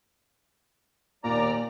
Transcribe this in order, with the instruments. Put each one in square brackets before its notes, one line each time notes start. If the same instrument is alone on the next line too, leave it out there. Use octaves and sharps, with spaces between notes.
[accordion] D#2 D5 A#5 [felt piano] A#2